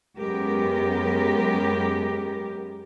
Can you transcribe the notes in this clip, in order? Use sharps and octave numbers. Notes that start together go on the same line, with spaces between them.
F#2 G#3 B3 G4 A#4